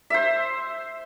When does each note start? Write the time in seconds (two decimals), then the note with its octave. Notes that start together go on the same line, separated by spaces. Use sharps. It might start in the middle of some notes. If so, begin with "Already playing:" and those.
0.10 C5 E5